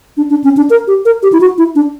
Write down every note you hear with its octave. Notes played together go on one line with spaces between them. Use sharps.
D4
D4
C#4
D4
A#4
G4
A#4
G4
E4
F#4
E4
D4